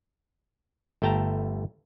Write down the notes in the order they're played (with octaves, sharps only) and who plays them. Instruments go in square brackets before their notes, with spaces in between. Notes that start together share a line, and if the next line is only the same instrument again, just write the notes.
[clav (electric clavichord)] G1 A3 G5 A5 A#5